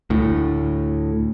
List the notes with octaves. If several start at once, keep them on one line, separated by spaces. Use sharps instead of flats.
D2 A2